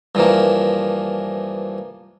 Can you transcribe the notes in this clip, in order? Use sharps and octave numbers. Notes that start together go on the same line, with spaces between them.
G2 E3 F3 A#3